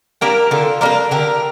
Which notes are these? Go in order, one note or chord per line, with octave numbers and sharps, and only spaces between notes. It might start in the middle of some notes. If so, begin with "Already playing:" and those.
G3 A#3 D4 G4 A#4
D3 F4 A4
G3 A#3 D4 A#4 D5
D3 G4 A#4